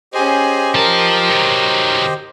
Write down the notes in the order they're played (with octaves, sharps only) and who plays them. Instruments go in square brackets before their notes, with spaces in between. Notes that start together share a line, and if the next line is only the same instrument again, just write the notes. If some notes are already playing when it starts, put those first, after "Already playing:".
[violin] C#4 G#4 [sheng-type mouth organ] G4 C5 D#5
[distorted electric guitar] F3 A5 [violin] A#4
[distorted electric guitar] D#3 F#3